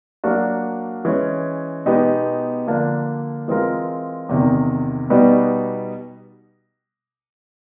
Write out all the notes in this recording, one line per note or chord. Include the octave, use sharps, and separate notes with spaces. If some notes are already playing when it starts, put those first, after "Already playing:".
F#3 A#3 D4 F#4
E3 G#3 C#4
B2 G#3 B3 D#4 G4
D3 F3 A#3 D4
E3 G#3 C4 F4 A#4
E2 C3 D#3
B2 G3 B3 D#4